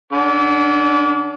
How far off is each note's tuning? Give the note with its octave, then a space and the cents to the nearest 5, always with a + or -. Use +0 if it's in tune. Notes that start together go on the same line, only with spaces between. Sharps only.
D3 +25 D4 -45 D6 -35